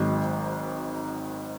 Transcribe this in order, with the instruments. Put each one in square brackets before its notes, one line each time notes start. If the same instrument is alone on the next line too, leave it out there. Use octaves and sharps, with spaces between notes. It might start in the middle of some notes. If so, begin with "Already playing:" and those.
Already playing: [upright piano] G#1 G#2 D#3 F#3